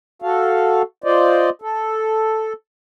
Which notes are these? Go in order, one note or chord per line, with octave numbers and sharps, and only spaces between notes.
F#4 A4 F5
F4 C5 D5 D#5
A4